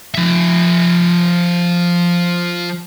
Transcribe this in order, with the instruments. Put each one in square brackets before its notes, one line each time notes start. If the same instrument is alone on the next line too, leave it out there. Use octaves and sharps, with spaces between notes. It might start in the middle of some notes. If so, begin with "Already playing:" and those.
[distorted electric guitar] F3 E5